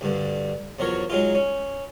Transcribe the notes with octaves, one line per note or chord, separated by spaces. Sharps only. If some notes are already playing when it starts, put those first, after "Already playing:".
D2 G2 D3
E2 F3 F#3 A#4 C#5
F#3 G#3 D#4 F4
C#4